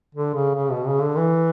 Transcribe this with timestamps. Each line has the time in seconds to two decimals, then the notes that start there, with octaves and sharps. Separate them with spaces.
0.15 D3
0.34 C#3
0.55 C#3
0.71 B2
0.87 C#3
1.02 D3
1.17 E3